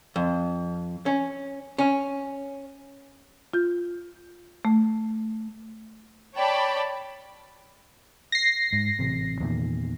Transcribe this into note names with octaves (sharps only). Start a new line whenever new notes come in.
F2
C#4
C#4
F4 G6
A3
C#5 D5 G5 A5 B5
A#6 C7
G#2
A1 C3
E2 A#2 D#3